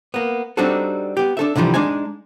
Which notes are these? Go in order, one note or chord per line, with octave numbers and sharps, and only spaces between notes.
A#3 B3
G3 C4 D4 D#4 F#4 A4
B3 G4
D4 A4 E5
C2 D3 E3 F3 G3
G#3 D4 D#4 G#5